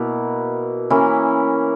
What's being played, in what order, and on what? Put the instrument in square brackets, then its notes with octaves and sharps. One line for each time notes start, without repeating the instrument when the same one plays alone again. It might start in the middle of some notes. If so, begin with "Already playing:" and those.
Already playing: [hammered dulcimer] B2 A#3 E4
E3 A#3 C#4 E4